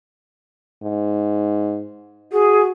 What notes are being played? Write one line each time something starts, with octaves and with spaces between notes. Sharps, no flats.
G#2
F#4 G#4